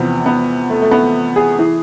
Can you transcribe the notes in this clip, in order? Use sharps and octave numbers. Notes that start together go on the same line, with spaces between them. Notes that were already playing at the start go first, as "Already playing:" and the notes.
Already playing: E2 C3 F3 B3
B3
A3
A3
B3
G#4
E3